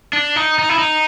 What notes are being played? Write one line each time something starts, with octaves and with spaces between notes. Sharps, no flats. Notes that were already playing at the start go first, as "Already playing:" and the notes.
D4
D#4
D#4
E4
D#4